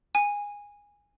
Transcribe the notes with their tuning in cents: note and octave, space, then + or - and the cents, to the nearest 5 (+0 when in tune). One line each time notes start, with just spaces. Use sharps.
G#5 -15